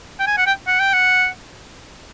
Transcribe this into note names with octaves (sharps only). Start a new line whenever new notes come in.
G5
G#5
F#5
G5
F#5
G5
F#5